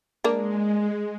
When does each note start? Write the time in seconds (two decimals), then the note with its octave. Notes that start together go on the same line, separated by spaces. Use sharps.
0.24 G#3 A#3 D4